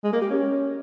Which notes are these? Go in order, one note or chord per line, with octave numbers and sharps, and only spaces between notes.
G#3
A#3
G4
C#4